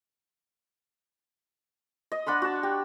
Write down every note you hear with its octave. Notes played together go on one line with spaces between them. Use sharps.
D#5
D4 F#5 B5 C6
F#4 A5
G4